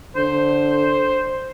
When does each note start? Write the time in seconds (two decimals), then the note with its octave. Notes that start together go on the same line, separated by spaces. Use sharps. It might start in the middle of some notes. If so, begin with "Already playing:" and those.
0.16 D3 C5